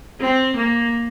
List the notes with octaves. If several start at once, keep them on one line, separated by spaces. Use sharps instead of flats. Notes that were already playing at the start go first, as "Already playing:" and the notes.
C4
A#3